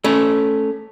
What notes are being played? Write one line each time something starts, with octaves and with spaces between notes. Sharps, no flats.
A3 C#4